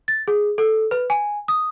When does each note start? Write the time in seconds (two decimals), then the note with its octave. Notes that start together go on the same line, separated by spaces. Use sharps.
0.08 A6
0.28 G#4
0.58 A4
0.91 B4
1.10 G#5
1.48 D#6